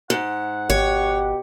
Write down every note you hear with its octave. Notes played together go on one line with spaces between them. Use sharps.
G#2 F#5
G#1 B2 G4 C#5